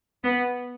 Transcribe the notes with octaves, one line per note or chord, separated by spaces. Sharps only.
B3